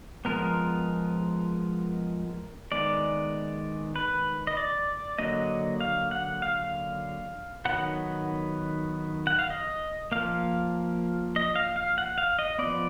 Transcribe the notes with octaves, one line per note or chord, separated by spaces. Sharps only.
F3 G#3 B3 A#4
D#3 G#3 B3 D5
B4
D#5
D5
D3 F#3 A#3 D#5
F5
F#5
F5
D#3 F#3 B3 F#5
F#5
F5
D#5
F3 A#3 F5
D#5
F5
F5
F#5
F5
D#5
F3 B3 D5